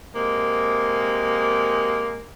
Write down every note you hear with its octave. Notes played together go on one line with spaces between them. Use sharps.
C3 G#3 A#3